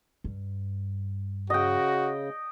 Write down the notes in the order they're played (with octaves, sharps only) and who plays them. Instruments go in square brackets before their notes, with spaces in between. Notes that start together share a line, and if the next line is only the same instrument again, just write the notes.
[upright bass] G2
[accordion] C#3 [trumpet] F#4 [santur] D#5 G5